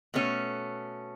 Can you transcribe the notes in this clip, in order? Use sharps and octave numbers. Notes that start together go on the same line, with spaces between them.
B2 A3 C#4